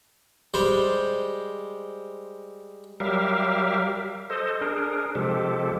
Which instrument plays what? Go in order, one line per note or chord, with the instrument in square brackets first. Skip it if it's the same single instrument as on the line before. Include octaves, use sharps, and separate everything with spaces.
[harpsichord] G3 G#3 C5
[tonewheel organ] F#3 G3 G4 A#4 E5 F5
A4 C5 D#5
D4 G#4 A#4
C3 F3 G#3 G4 A4